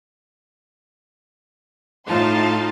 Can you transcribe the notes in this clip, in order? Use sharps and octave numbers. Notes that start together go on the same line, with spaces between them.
A2 D#4 F4 F5 A5 C6